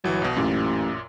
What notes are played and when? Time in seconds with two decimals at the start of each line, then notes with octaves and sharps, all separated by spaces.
0.04 G1 E3 F#3
0.22 B1 B2
0.36 A1 F#2 A#2